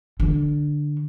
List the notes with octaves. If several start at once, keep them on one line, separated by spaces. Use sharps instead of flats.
D3